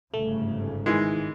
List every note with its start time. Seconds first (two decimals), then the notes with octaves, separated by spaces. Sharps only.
0.14 G1 G#2 C#3 A3
0.86 D#3 E3 G#3